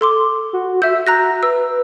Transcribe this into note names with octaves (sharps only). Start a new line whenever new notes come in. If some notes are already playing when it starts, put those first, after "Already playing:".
A4 C6 D6
F#4
E5 E6 G6
F#4 A#5 F#6 A#6
B4 E6